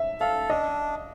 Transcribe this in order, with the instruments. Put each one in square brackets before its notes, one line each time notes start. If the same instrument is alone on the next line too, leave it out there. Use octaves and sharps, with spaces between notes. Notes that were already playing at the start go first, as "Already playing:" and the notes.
Already playing: [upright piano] E5
[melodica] A4 [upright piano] F5
[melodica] D4 [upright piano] D#5